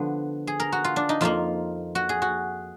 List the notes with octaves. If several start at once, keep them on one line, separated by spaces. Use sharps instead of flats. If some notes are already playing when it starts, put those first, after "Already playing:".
Already playing: D3 F3 B3
G#4
A#4
F#4
F4
D4
D#4
F2 F3 A#3 F4
F#4
G#4
F#4